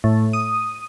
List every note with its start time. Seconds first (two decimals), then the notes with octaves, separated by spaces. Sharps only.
0.04 A2
0.33 D#6